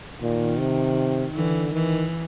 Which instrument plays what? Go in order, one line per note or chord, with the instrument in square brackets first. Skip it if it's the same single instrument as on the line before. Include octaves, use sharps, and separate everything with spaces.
[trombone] A#2 [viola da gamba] D#3
[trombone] C3
[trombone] D3 [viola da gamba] E3
[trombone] D#3 [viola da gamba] E3